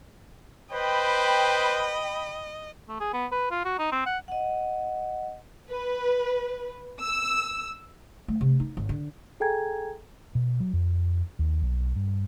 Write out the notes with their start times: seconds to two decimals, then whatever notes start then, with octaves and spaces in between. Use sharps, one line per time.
0.73 B4 C5 D#5 G5 B5
2.88 A3
3.00 G#4
3.13 B3
3.32 B4
3.51 F4
3.65 F#4
3.79 D#4
3.92 C4
4.06 F#5
4.28 D#5 F#5
5.70 B4
7.01 E6
8.28 A3
8.41 C3
8.60 D#4
8.77 G#1
8.89 D3
9.40 G#4 A4 G5 G#5 A#5 G#6
10.35 B2
10.60 F#3
10.73 F2
11.39 D#2
11.62 B1
11.96 G2